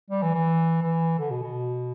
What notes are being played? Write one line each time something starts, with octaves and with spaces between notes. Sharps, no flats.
G3
E3
E3
E3
D3
B2
B2